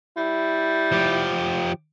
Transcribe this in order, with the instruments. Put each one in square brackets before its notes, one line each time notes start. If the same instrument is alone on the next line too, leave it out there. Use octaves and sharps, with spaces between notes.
[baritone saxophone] G3 [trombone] E4
[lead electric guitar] F3 G4